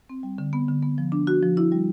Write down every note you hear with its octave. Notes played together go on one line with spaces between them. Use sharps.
C4
G3
D3
B3
D3
B3
F3
D4
F#4
F3
E4
G3